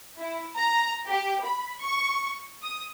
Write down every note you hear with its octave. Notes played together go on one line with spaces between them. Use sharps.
E4
A#5
G4
B5
C#6
D#6